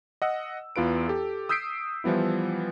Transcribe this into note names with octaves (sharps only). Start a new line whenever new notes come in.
D#5 F#5 E6
E2 F4 B4 D7
G4 A4
D#6 E6 G6 B6 C7 D7
E3 F3 G3 B3 E4